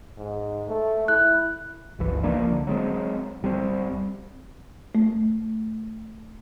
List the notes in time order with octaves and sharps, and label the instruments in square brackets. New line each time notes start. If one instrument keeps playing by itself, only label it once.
[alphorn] G#2
A3
[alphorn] E4 [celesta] F#6
[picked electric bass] G1 C#2 E3
C2 F3 A#3 D4
D3
F#3 G#3 C4
D1 G3 A#3 C4
[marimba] A3